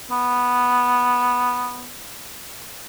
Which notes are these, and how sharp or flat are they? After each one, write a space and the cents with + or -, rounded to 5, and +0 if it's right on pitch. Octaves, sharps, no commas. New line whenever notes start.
B3 -5